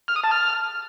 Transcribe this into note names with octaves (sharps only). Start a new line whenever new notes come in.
F6
D#6
A5
F6